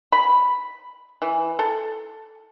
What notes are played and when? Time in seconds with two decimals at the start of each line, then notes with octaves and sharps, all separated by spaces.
0.12 B5
1.22 E3
1.59 A4